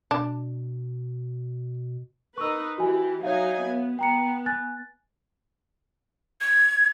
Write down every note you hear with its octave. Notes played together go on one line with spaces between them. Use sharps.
B2 D4
D#4 A#4 B4 C#6 E6
E3 F#4 G4 G#5
F#3 D#4 C#5 E5 F5 G#5
B3
B3 G5 A#5 C#7
G#5 F#6 A6
G#6